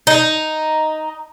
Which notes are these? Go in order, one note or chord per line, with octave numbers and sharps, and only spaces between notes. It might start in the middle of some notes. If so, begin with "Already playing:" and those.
D#4